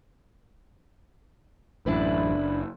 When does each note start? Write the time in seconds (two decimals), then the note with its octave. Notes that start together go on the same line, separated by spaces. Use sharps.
1.86 A1 F#2 D4 E4 B4
2.31 F#1